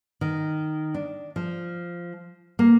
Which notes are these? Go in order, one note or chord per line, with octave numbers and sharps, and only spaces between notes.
D#3
D4
F3
A#3